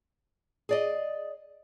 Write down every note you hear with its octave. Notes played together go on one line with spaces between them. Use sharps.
G#4 D5 D#5